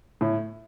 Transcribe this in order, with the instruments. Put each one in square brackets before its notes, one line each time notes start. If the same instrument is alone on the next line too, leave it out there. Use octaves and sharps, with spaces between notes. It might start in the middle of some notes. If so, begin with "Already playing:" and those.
[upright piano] A2